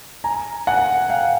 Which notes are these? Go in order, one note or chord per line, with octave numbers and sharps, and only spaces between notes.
G#5 A#5
F#5 G#5
F5 G5